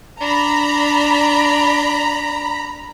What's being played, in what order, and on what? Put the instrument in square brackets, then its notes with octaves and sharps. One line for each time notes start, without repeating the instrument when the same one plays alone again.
[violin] D4 [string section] A#5 B5